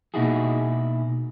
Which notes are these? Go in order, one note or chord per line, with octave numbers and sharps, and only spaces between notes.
B2 A#3 D#4 E4 F#4 G#4